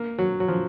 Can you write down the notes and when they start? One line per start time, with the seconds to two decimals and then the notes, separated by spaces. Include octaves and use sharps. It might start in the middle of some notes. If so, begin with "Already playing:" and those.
Already playing: A#3
0.18 F#3
0.40 F#3
0.48 F3